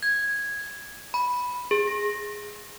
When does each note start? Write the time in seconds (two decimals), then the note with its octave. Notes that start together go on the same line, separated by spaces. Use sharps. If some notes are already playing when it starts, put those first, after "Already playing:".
0.03 G#6
1.14 B5
1.71 G#4
1.87 A#6